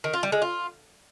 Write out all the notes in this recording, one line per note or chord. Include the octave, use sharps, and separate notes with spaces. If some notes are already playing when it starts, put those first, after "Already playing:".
D#3
F4
G3
G#3
F4